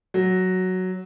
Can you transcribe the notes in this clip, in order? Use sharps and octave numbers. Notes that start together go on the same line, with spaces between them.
F#3